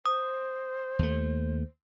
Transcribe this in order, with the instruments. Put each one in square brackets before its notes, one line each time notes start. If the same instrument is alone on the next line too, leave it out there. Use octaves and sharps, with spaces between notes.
[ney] C5 [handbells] D#6
[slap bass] D#2 A3